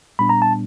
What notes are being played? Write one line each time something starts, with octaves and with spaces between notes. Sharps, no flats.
A#2 G3 B3 D4 B5
A#5
A5